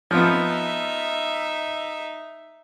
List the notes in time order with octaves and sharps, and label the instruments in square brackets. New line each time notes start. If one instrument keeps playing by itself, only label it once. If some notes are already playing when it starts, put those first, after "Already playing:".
[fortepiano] F3 B3 [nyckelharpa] D#4 E5